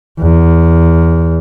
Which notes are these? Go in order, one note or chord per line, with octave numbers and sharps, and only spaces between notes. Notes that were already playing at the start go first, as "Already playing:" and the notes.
E2